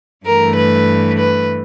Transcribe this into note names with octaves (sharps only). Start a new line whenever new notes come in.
G2 E3 A3 A#4
B4
B4